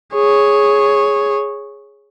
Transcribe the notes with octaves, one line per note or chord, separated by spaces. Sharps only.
G#4 C#5